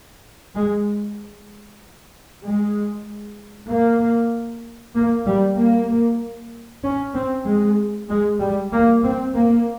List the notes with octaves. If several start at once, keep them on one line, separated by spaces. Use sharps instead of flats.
G#3
G#3
A#3
A#3
G3
A#3
C#4
C4
G#3
G#3
G3
A#3
C4
A#3